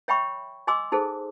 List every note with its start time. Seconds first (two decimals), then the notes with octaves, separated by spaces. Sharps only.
0.08 C#5 E5 G5 B5 C#6
0.67 D#5 G#5 C6 D6 E6
0.92 D#4 G#4 A4 C5